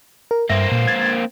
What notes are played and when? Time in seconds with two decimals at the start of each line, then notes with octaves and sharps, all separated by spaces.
0.31 A#4
0.50 G2 A#3 C4 E5 A#6
0.71 A#2
0.87 G#6 A6